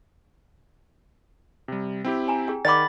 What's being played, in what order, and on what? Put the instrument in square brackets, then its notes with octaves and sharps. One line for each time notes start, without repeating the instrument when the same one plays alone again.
[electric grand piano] C3 G3
C4 E4 G4
[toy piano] G#5 A#5
G#4 G5
[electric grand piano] D#3 [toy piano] D5 F#5 D6 [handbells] B5 A6